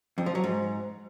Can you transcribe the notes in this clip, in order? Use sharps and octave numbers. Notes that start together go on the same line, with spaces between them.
F2
F3
F#3
G#2